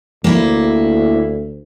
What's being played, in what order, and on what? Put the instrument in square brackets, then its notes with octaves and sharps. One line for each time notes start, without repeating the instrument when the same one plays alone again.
[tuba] D2 [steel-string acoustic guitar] A#3 E4